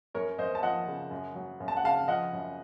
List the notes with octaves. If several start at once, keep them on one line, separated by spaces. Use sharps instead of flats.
F#2 A#4 C#5
F#2 C5 D#5
A5
F3 D#5 F#5
C#3
F#2
F#3
F#2
A5
F#5
C#3 F5 A5
F3 D#5 F#5
F#2